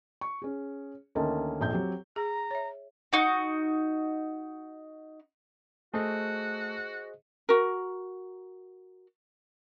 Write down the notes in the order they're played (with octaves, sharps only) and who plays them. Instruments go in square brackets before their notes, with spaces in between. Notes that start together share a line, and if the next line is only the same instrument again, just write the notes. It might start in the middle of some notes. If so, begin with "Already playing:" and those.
[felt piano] C#6
C#4 G#4
D2 D#3 A#3 C#4 D#5 A5
A#1 F2 G6
F#3 C4 G4
[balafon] G#4 [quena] A#5
[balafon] C#5 E5
[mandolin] D#4 F#4
[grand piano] A3 [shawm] F#4 [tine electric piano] G#4 C5 D#5
[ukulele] F#4 A#4